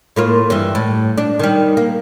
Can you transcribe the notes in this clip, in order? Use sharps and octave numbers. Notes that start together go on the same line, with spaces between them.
A2 A#3 F4
G2 E3
A2
D4
D#3 G3
A#3